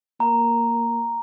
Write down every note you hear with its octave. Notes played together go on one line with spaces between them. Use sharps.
A#3 A#5